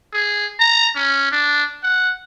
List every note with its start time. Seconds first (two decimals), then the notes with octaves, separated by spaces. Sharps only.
0.13 G#4
0.60 A#5
0.95 C#4
1.32 D4
1.83 F#5